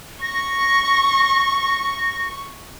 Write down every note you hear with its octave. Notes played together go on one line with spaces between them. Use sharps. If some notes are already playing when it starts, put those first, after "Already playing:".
C#6 A#6